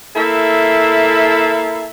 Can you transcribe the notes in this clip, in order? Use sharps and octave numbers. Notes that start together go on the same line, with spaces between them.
A#3 E4 A4 E5